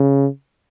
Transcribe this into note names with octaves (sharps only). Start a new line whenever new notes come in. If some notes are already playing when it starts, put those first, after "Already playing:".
Already playing: C#3